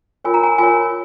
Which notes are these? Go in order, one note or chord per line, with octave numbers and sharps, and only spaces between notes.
F4 A#4 C#5 G#5
A#5
G#5
F4 A#4 C#5 G#5